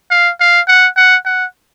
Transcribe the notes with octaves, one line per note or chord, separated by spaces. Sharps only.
F5
F5
F#5
F#5
F#5